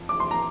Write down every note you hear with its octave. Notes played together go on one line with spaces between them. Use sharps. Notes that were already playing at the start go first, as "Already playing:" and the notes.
Already playing: F2 F3
D6
C6
A#5